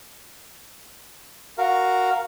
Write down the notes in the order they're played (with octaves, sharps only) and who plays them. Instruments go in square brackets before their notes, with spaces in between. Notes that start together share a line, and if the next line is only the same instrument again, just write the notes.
[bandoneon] F#4 A#4 F5